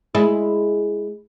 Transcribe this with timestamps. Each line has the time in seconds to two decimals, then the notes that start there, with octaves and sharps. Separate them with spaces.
0.15 G#3 E4